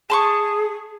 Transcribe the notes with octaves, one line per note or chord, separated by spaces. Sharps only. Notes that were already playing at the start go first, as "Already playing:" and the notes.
G#4 A5 C6 C#6